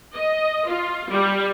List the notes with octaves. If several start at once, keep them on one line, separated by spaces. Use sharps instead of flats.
D#5
F4
G3